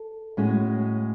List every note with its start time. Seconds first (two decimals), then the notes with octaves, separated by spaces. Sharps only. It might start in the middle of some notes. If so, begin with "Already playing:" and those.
Already playing: A4
0.37 A2 G#3 C#4 F#4